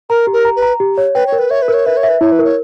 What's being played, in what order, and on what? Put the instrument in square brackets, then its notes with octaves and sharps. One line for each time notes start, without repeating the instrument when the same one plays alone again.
[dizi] A#4 [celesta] A#5
[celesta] G4
[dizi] A#4
[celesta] A#5
[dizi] B4
[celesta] A#5
G4
C#5
[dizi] B4 [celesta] G5
[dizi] C#5
[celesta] A#4
[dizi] B4
[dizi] C#5 [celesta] E5
[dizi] B4
[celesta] A#4
[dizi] C#5
[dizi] B4 [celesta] E5
[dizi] C#5
[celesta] E5
[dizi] B4
[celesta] E4 [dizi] C#5
[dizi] B4
[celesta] A#4
[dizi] C#5